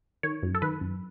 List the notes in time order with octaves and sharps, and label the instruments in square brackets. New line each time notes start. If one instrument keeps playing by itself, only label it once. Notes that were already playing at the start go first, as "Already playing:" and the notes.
[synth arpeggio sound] D#3 C#5
F#2
A4
D#3 B4
F#2